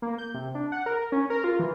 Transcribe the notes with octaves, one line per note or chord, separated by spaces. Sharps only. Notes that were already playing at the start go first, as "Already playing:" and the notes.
A#3
G6
C3
D4
F#5
A#4
C#4
A#4
F4
E3